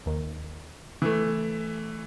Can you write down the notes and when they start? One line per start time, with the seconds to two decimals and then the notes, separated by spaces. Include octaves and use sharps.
0.06 D#2 D#3
1.02 E3 A3